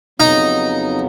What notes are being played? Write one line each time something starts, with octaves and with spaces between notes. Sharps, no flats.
F2 C#3 F#3 B3 D#4